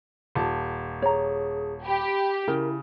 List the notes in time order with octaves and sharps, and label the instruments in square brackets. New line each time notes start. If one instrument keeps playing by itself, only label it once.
[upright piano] D#1 A5
[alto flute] G#4 [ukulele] C#5 A#5
[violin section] G4 [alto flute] B5
[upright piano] C#3 [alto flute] E4 [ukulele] A#4